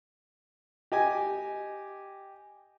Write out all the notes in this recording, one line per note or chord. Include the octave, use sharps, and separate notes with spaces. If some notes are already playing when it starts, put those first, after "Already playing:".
G4 D#5 G#5